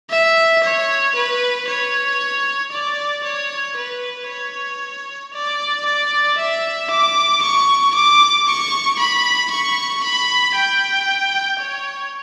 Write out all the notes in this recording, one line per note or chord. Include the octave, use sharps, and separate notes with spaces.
E5
C#5
B4
C#5
D5
C#5
B4
C#5
D5
D5
E5
D6
C#6
D6
C#6
B5
C#6
B5
G5
C#5